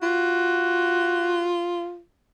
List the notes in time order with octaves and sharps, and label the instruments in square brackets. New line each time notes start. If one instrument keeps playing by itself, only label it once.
[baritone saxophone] F4 [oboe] F#4